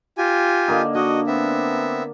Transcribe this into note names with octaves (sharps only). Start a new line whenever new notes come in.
F4 G4 G#5
D3 A#3 D#4
D4 F#4 D#5
B3 C4 E5